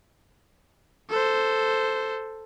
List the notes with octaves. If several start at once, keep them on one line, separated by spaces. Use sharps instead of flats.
A4 C5